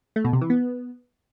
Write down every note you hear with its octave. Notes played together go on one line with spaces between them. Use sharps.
A3
B2
C3
E3
B3